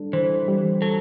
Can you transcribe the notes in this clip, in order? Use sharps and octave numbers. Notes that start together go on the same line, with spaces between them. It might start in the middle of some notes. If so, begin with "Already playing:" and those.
Already playing: G3 D4 A4
E3 C5
G3
F#3 A4